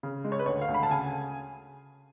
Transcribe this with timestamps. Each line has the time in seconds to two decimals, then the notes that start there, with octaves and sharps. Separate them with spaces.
0.03 C#3
0.25 G#3
0.32 C#5
0.39 B4
0.46 D2 C#5
0.61 F5
0.69 D2
0.74 B5
0.83 A5
0.90 C#3 G#5